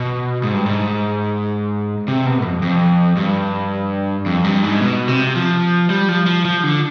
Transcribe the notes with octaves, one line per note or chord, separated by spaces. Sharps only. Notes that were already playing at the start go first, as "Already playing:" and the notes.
Already playing: B2
G#2
G2
G#2
C3
B2
F2
F2
G2
F2
G2
G#2
B2
C3
F3
G3
F3
F3
F3
D3